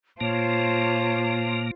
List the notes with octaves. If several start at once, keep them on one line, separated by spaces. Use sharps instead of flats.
A#2 A#3 F4 C5 C#5 A5